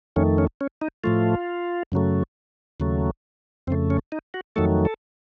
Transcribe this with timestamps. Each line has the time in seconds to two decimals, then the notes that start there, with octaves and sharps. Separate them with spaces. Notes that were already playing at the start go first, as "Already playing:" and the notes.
0.16 F2 D#3 A3 C#4
0.38 C#4
0.61 C#4
0.82 D#4
1.04 A2 F3 A3 F4
1.92 F#2 C#3 F#3 A3
2.80 D#2 C#3 F#3 A3
3.67 F2 C4
3.70 C#3 A3
3.90 C#4
4.12 D#4
4.34 F#4
4.56 F2 D#3 F#3 A3 A4
4.85 A4